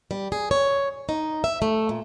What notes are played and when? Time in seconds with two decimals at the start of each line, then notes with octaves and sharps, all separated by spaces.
0.11 G3
0.32 G#4
0.51 C#5
1.09 D#4
1.44 E5
1.62 A3
1.89 A#2